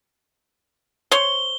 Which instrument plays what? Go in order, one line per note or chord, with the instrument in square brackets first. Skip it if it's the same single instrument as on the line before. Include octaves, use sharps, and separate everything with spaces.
[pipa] C5 C#5 [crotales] G7